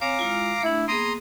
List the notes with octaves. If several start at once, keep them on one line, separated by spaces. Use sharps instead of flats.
C4 C#5 F5 G#5 A#5 D6
G#3 E4 F4
A3 D4 E4
A#3 B3 G#4 A#5 C6 D#6